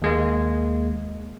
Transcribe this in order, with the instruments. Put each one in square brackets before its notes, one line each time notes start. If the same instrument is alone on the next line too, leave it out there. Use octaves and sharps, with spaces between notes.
[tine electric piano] D#2 G#3 A#3